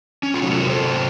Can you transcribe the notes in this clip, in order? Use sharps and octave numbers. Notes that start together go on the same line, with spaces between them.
C#4
F4
C3 F#3 A3 D#4 F#4
F4 A4
F#4 A#4
A4 C5